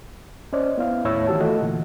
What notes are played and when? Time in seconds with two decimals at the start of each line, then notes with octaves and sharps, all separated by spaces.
0.53 C#4 C5 D5 D#5
0.78 B3 E4 F5
1.04 D#2 A2 E4 C#5 E6
1.27 D#3 E3 F#4 G4 A5
1.40 A3 F4 F#4 A4 D#5
1.62 A#2 D3 E3